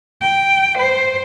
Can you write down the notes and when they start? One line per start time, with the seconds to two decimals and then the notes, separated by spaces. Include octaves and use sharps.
0.21 G5
0.78 C5